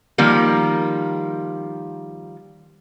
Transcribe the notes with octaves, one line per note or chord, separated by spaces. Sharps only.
D#3 F3 G3 A#3